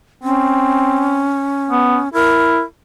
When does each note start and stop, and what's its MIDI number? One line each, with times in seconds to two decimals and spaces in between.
0.23 1.33 60
0.23 2.09 61
1.70 1.98 59
2.14 2.61 64
2.14 2.61 70